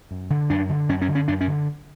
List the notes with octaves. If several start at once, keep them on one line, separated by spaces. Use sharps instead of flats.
F#2
D3
F#2 D4
D3
F#2 C#4
C#4
D3
C#4
F#2 D4
C#4
D3